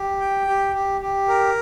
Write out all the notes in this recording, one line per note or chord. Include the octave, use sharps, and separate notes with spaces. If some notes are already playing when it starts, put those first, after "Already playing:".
Already playing: G4
G5
G4
G4
G4
A#4